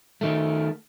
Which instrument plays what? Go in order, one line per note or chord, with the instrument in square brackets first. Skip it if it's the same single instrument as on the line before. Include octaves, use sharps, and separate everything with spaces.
[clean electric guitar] D#3 A3